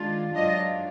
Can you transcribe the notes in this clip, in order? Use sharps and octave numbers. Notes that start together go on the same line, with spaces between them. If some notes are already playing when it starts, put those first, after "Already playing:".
Already playing: D#3 G#3 D4 F4
G#2 F#3 D4 F4 D#5